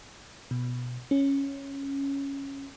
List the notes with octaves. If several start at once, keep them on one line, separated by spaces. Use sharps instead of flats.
B2
C#4